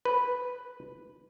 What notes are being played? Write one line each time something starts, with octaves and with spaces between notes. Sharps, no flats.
B4